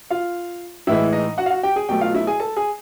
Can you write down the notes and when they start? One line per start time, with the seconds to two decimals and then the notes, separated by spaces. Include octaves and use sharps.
0.10 F4 F5
0.87 A2 E3 G#3 E4 E5
1.13 D#4 D#5
1.38 F#4 F#5
1.46 F5
1.50 F#4 F#5
1.63 G4 G5
1.76 G#4 G#5
1.89 B2 F#3 A3 G4 G5
2.01 F4 F5
2.15 E4 E5
2.27 G#4 G#5
2.40 A4 A5
2.57 G#4 G#5